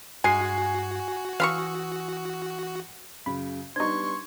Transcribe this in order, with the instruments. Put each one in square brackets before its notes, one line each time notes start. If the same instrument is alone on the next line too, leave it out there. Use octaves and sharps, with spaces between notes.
[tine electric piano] G2 [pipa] G#3 [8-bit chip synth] F#4 [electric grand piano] G#5 C7
[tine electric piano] E3 D#6 E6 [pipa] F5 B5 C#6
[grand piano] F#2 C#3 [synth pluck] B5
[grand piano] G3 B3 D4 [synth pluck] D#4 C5 [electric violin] C6 C#6 [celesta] G#6